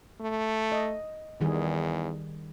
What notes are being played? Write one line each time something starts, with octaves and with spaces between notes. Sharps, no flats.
A3
D#5
E2 D#3 G3 G#4